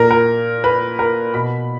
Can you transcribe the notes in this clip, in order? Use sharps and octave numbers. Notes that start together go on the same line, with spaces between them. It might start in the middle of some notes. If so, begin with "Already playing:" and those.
Already playing: A#2 A#4
A#4
B4
A#4
B2 B5